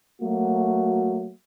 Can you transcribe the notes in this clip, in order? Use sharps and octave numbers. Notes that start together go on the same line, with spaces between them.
F#3 A3 A#3 F#4